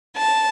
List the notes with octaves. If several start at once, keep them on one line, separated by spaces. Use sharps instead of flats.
A5